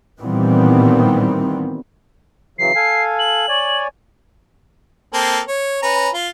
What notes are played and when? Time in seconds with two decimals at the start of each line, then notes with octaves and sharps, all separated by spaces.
0.20 A#2 D#3 E3 G3 B3 C4
2.58 C#3 E3 F#3 C7
2.76 A4 F5 G#5
3.19 F#7
3.49 C#5 D5 G#5
5.13 A#3 C4 A4
5.48 C#5
5.82 C#4 B4 A#5
6.14 F4